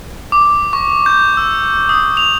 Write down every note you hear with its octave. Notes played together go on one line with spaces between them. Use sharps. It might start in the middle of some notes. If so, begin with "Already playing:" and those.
D6
C#6
G6
E6
D#6
F7